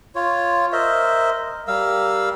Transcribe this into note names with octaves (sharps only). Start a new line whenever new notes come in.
F4 C#5
A#4 C5 D#5 E5
G3 A#4 F5 E6